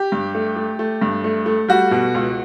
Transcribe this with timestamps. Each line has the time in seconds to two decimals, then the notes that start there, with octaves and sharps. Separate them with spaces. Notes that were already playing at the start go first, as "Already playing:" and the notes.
Already playing: G4
0.12 G2
0.35 A3
0.56 A3
0.79 A3
1.01 G2
1.24 A3
1.46 A3
1.68 G3 F#4
1.91 B2
2.14 C#2